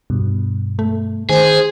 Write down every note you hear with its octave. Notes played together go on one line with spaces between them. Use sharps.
G2 B2
A3
D#3 G#4 C5